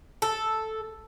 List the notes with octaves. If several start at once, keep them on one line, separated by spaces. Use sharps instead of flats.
A4